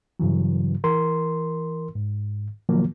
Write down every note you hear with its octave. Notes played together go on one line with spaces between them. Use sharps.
G2 C#3 E3 F#3
E3 A#4 C6
G#2
B2 D#3 F3 F#3 A#3